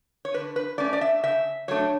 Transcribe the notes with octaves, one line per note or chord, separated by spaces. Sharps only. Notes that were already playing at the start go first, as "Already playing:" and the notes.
C#5
D3 B4
B4
A3 C#4 D5
D5
E5
C#3 E5
F#3 A3 D4 C#5